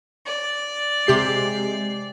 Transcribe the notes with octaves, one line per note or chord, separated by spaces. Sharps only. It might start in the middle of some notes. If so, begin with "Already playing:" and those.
D5
C3 G#3 G4 C7